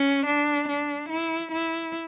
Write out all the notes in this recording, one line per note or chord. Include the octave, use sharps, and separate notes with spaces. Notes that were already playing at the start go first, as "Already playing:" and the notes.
Already playing: C#4
D4
D4
E4
E4